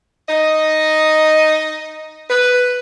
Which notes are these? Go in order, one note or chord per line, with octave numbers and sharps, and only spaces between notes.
D#4 D#5
B4